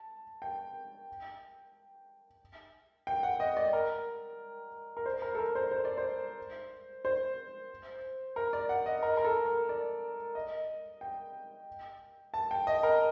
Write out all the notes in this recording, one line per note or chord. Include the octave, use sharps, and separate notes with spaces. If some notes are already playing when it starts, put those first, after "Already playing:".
Already playing: A5
G5
G5
F#5
D#5
D5
A#4
A#4
C5
A#4
A4
A#4
C5
C5
D5
C5
C5
A#4
D5
F#5
D#5
A#4
A#4
A4
A#4
D5
D#5
G5
A5
G5
D#5
A#4